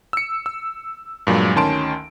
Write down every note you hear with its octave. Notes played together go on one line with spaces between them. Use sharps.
E6 C#7
E6
G2 A#2 F#3 G#3
D2 D#3 C#4 A5 C6 D7